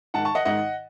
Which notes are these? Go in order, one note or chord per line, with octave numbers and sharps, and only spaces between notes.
G#2 D#3 F#5 A5
A5 C#6
D#5 F#5
G#2 D#3 D#5 F#5